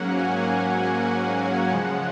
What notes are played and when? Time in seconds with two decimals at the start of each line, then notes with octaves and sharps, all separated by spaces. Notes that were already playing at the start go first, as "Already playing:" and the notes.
Already playing: G#2 F#3 A#3 C#4 F#5
0.18 G#5
1.20 G#5
1.71 C#3 F3 G#3 F#5